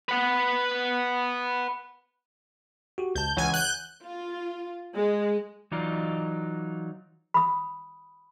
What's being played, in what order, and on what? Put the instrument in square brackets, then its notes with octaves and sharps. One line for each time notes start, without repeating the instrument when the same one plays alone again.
[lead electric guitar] B4 F#5
[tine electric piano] F#4 G4
[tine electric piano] C#2 A5 [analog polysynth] G6
[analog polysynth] C#2 G#5 [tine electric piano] E3 C#5 F#5
[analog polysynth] F#6 G6
[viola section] F4
G#3
[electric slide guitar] E3 F#3 D#4 F4 D5
[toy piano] B5 D#6